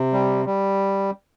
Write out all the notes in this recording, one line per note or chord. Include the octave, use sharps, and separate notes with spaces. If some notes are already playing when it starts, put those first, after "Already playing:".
Already playing: C3
G3
G3